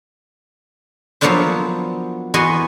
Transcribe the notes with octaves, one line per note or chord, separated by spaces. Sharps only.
F3 F#3 A#3 B3 D4 C5
E2 B3 F#4 D#5 G#5 C6